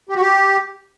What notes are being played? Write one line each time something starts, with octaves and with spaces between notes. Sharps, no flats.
G4
F#4
G4